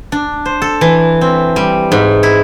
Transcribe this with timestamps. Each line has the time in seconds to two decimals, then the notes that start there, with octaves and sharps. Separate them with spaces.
0.12 D4
0.45 C5
0.62 A4
0.81 E3
1.21 C4
1.56 G3
1.92 G#2
2.23 E4